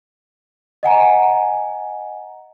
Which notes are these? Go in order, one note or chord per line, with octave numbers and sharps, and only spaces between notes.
D#5 F#5 G#5 A#5